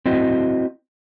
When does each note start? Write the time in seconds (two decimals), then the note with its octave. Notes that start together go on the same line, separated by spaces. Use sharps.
0.06 C4 E4 F#4 C5 D#5